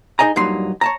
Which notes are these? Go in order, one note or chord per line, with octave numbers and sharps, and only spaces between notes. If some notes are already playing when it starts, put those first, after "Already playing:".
D#4 G#4 D#5 G#5 A#5
G2 A#2 F#3 D#4 C6
C#5 A5 A#5